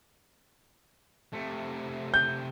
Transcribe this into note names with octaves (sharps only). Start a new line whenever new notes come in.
C3 A3
G6